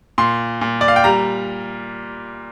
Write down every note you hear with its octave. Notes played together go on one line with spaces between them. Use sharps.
A#2 C6
A#2
D5
F5
G5
G3 A#5